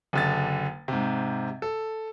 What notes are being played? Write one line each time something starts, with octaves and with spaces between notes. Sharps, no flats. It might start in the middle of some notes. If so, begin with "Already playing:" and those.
F#1 D3 A6
G#2 C3
A4